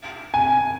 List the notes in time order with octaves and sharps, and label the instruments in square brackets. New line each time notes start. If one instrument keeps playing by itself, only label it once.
[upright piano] G#5